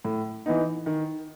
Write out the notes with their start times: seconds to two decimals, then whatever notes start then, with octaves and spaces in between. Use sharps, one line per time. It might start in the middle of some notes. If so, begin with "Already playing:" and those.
0.05 A2
0.46 E3 B3 D#4
0.86 D#3